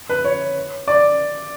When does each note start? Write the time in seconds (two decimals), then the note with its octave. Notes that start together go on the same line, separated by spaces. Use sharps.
0.09 B4
0.24 C#5
0.88 D5